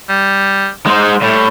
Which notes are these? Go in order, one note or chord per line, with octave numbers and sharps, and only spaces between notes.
G3
G#3 D#4 C5
A2 G3